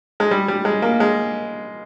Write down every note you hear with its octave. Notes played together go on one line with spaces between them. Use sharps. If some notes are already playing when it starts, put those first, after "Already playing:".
G#3
G3
G3
G#3
A#3
G#3